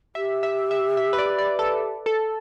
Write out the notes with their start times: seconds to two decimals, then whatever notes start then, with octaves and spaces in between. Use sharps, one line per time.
0.15 G4 E5
0.43 E5
0.71 E5
0.97 E5
1.13 B4
1.18 D5
1.38 D5
1.59 A4
2.06 A4